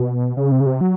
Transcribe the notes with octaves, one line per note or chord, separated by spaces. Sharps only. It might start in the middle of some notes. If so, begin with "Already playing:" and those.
Already playing: B2
C#3
C3
C#3
C3
F#3